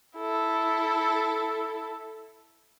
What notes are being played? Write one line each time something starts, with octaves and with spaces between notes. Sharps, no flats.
E4 A4